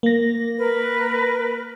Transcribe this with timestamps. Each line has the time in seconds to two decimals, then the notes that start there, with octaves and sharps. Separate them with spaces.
0.03 A#3 A#6
0.58 A#4 B4